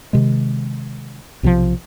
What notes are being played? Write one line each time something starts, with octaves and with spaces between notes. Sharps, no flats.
C3 D#3 G#3
B1 C3 E3 F3